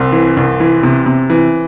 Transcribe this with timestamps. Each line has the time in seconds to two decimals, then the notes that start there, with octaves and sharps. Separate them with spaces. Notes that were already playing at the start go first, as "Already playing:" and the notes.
Already playing: C2 C4
0.12 E3
0.37 C2
0.60 E3
0.83 C3
1.06 C3
1.30 E3